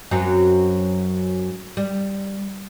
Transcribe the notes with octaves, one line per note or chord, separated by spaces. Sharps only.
F#2 F#3 C4
G3